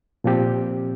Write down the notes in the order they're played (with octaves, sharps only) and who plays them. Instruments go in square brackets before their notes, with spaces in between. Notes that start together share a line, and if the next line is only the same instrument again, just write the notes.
[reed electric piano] A#2 F3 C4 G4